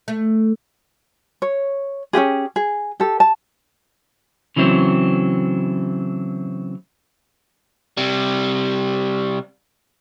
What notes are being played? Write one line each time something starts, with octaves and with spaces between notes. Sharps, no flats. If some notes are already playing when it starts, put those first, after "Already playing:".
A3
C#5
C#4 F4 G4 G#4
G#4
G4 A4
A5
C#3 E3 F#3 A3 C4
C3 G3